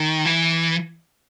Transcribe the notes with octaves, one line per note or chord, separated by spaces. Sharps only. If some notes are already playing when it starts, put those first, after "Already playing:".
Already playing: D#3
E3